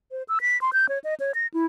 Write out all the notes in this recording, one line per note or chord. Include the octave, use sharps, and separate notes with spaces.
C5
E6
B6
C6
G6
C#5
D#5
C#5
A#6
E4